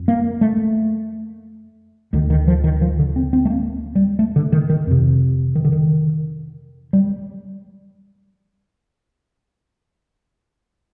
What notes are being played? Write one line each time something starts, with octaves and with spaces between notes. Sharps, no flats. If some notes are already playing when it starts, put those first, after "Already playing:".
Already playing: F2
A#3
A3
D2 D3 D#3
D#3
F3
D#3
F3
D3
C4
C4
A3
A#3
G3
A3
D3
D#3
D#3
F2 C3
D#3
D3
D#3
G3